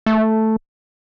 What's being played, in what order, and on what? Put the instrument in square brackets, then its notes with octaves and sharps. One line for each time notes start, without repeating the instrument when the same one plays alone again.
[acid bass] A3